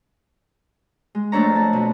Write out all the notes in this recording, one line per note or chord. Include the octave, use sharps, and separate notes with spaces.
G#3
F2 A3 A#3 D4 C#5 A#5
A5
B2